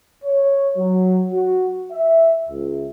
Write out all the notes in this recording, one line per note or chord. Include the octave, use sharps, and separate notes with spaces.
C#5
F#3
F#4
E5
C#2